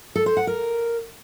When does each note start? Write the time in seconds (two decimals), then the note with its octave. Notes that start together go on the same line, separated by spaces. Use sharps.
0.16 A4
0.26 C5
0.37 F#5
0.47 A#4